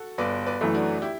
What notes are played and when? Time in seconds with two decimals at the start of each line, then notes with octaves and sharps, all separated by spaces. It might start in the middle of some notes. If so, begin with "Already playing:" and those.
Already playing: F#4 A4
0.18 G1 B4 D5
0.46 B4 D5
0.61 F#2 E3 A3
0.74 D4 F#4
1.02 E4 G4